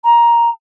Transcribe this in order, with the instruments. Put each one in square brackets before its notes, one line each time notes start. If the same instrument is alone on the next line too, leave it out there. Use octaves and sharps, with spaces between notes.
[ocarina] A#5